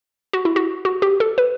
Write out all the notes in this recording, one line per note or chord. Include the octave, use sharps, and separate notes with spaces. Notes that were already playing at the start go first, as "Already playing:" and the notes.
F#4
E4
F#4
F#4
G4
A4
B4